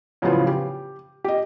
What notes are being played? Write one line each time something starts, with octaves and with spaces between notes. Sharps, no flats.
A2 C#3 F3 F#3 B3 F4
G4
G4 D#5